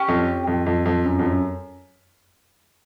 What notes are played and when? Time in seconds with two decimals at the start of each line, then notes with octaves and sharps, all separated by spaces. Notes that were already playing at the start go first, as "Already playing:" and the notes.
Already playing: C#4 G4
0.08 F2
0.47 F2
0.66 F2
0.86 F2
1.04 F#2
1.19 F2
1.24 F#2